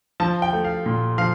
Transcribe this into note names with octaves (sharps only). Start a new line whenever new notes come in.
F3 A5
G5
A3
F5
A#2
F3 F5